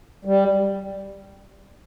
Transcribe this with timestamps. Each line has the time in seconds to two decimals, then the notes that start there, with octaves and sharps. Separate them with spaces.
0.25 G3